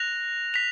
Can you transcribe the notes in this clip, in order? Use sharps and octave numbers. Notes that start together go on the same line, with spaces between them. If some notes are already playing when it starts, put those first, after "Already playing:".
Already playing: F#6 A#6 F7
B6 F7